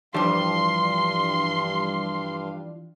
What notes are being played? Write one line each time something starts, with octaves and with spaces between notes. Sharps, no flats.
G2 E3 F3 G3 D4 F5 C6